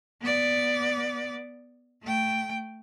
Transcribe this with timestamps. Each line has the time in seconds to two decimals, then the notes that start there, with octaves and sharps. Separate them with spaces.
0.21 B3 D5
2.02 A3 G5